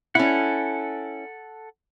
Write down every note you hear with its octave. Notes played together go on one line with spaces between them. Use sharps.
C#4 E4 A4 F#5